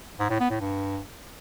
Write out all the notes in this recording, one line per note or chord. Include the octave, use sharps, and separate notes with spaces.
G#2
A2
B3
A2
G2